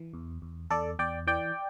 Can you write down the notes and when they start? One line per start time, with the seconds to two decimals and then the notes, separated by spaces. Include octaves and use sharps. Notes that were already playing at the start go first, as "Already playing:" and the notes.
Already playing: E3
0.14 E2
0.42 E2
0.70 E2 A4 D5
0.99 E2 D5 G5
1.27 E3 D5 G5